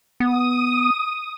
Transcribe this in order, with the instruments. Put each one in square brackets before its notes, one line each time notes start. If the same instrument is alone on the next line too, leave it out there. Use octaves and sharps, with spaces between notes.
[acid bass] B3 [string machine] D#6